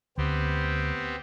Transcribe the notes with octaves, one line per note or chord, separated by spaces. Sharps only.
D2 B3 C4 G4